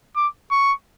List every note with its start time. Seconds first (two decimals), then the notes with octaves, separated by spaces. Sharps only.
0.16 D6
0.51 C#6